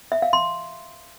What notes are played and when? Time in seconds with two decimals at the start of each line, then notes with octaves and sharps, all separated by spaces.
0.12 E5
0.22 F5
0.33 C6